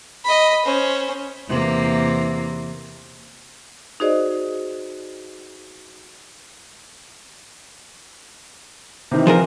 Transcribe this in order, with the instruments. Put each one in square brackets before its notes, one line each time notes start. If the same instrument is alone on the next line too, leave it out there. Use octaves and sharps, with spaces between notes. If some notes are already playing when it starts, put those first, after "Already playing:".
[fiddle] D#5 B5
C#4 C5
[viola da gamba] E2 C3 A#3
[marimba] D#4 F#4 G#4 C5 D5 D#5
[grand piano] C3 D#3 E3
[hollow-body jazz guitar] F3 G#4 A#4